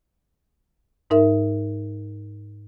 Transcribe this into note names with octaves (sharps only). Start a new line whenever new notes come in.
G#2 D#4 A#4 E5